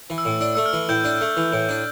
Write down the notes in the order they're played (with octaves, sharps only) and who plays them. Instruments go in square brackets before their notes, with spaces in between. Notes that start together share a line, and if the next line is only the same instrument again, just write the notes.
[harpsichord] E3
[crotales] E6
[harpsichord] A2
[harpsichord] D4 [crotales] E6
[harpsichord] A3 [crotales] E6
[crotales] F6
[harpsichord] E3
[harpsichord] A2 [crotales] G6
[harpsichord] D4
A3
E3
A2
D4